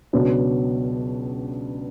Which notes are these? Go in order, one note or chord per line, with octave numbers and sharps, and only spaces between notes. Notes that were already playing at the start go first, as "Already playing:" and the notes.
C#2 B2 F#3 B3 D4